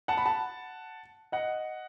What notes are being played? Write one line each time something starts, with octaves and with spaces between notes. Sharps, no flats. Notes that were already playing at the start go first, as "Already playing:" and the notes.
F#5 A5
B5
F#5 A5
D#5 F#5